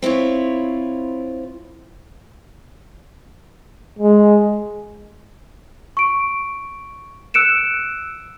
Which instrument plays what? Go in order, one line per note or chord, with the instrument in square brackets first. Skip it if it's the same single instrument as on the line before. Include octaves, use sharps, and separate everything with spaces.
[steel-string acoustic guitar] C4 E4 F4 C#5
[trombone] G#3
[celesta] C#6 D7
E6 F#6 C#7 D7 E7